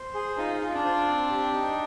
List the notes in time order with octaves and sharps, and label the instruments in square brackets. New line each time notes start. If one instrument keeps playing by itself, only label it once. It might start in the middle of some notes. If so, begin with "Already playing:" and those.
Already playing: [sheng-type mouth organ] C5
G#4
[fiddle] D#4 [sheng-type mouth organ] F4
[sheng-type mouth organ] F4
[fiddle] D4
[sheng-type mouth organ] C5
C4
G4
D#4